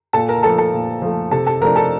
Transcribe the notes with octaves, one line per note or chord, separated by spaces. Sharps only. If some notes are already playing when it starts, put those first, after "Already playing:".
A#2 A4 A5
A#4 A#5
F3 A3 A4 A5
A4 A5
A#2
F3 A3
C3 A4 A5
A4 A5
F3 A3 D4 A#4 A#5
A4 A5